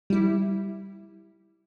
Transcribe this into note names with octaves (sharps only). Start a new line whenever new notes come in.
G3 E4